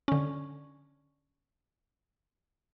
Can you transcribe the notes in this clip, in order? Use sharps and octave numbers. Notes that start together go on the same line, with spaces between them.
D3 C#4